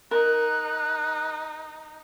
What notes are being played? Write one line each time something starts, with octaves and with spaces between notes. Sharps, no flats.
D#4 A#4 F#6